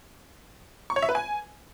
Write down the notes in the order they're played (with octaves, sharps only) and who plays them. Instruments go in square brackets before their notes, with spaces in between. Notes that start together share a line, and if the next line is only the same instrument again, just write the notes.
[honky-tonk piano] C#6
C#5
E5
B4
G#5